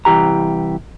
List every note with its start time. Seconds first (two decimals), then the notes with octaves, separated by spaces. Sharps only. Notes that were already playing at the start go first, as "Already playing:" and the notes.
0.05 C2 A#2 E3 G4 A#5